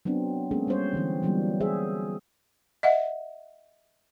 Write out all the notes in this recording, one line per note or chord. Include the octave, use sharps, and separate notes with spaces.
F#3 B3 C4 D4
G#3 A#3 B3 C#4 G#4 A4
G3 C4 C#4 C5 C#5
D3 E3 C4
E3 F#3 G3 A#3 B3 D#4
G#4 C5 E5
D#5 E5 F#5